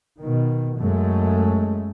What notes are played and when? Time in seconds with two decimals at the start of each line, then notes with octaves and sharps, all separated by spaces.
0.20 B2 D#3
0.80 F#2 G#3 A3